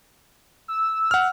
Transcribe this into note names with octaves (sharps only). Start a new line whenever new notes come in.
E6
F#5 F6